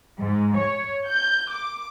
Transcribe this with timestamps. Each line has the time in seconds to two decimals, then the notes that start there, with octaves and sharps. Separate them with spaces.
0.19 G#2
0.57 C#5
1.07 G6
1.50 D6